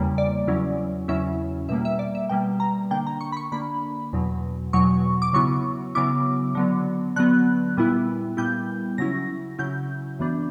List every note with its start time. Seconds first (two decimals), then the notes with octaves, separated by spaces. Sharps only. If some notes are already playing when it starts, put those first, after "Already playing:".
Already playing: E2 C#3 G3 A#3
0.18 D5
0.47 E2 C#3 F#3 C#4 E4
1.08 E2 C#3 F#3 C#4 E4 E5
1.69 B2 G3 A#3 E5
1.85 E5
1.99 D5
2.15 E5
2.29 B2 G3 A#3 G5
2.60 A#5
2.91 D3 A#3 D4 G5
3.07 A#5
3.21 C#6
3.32 B5
3.37 C#6
3.52 D3 A#3 D4 B5
4.13 E2 B2 F#3
4.73 E2 B2 F#3 C#6
5.22 D6
5.33 C#3 F#3 B3 E4 C#6
5.95 C#3 F#3 B3 E4 D6
6.55 D3 F#3 B3
7.16 D3 F#3 B3 F#6
7.77 A#2 G3 B3 E4
8.37 A#2 G3 B3 E4 G6
8.98 C#3 F#3 C#4 E4 A#6
9.59 C#3 F#3 C#4 E4 G6
10.19 F#2 E3 B3 D4